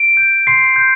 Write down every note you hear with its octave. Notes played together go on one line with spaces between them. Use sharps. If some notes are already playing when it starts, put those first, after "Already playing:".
Already playing: D7
G6
C6 C7
G6